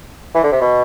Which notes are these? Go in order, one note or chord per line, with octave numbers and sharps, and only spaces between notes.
E3
D3
C3
B2